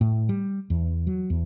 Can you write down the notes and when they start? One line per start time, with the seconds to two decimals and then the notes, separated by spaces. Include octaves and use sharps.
0.01 A2
0.29 G3
0.70 E2
1.07 F#3
1.30 E2